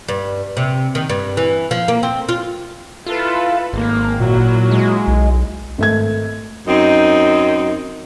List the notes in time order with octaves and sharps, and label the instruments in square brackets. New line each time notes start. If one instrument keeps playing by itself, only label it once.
[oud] G2
C3
D#3
G2
E3
F3
A#3
C4
F4
[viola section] E4 A4 B4 [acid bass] F4
[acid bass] G#1 [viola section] A#3
[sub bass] A#2 [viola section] F#3 A#3 E4
[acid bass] G#3
[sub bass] B1
[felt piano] G#1 A3 G#6
[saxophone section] F#2 C4 D#4